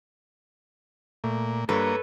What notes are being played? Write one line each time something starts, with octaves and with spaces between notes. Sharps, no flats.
A#2 A3
G2 A#3 A4 B4 C#5